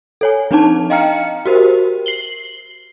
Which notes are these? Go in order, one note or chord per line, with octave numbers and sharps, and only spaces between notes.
A4 C#5 G#5
F3 C4 D4 D#4 A5
D#5 F5 G5 A#5 F6 C#7
F#4 G4 A#4 C5
C7 F#7 G7